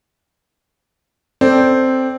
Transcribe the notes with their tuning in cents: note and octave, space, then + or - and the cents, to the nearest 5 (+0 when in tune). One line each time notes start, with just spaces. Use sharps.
C4 +0 A4 +0 D5 +0